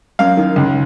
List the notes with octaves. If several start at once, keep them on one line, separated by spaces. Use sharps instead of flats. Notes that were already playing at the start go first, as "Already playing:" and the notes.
F#2 F5
D#3
C#2